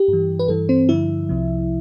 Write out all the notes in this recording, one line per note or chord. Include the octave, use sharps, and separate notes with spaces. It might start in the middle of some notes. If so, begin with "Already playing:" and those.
Already playing: G4
G2 E3
B4
G2 E3 A4
C4 C5
G2 D3 F3 E4 E5
C2 C3 F3